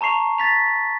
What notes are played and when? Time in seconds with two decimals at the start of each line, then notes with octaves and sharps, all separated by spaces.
0.01 A5 A#5 C#6 C7 F7
0.38 A6 B6 F7